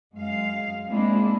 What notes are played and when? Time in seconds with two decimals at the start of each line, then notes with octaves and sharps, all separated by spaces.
0.14 F#2 G#3 F5
0.88 G#3 A#3 C4 D4 E4